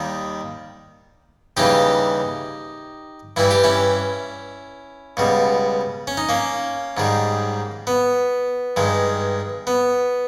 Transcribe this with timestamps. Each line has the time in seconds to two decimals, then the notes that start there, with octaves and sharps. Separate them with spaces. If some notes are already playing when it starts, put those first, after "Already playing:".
Already playing: D#2 D#3 G3
1.57 D#2 C#3 E3 G3 D#4 G4
3.36 G2 E3 G3 E4
3.51 G4
3.64 C#4 E4
5.17 C#2 B2 G3
6.07 C#4
6.17 D#4
6.29 A#3 C#4
6.97 G#2 D#3 G3
7.87 B3
8.76 G2 D#3 G#3
9.67 B3